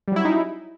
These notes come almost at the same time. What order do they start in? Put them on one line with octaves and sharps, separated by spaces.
G3 F#3 E4 C#4 D#4